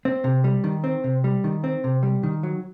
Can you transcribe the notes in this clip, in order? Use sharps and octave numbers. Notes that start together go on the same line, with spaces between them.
C4
C3
G3
D#3
C4
C3
G3
D#3
C4
C3
G3
D#3
F#3